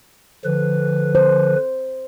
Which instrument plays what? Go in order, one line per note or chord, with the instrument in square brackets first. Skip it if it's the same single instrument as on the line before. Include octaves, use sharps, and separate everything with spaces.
[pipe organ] D3 F3 B4
[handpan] C5